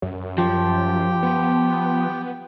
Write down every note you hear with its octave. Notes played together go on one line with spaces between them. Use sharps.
F#2
F3 G4 G5
B3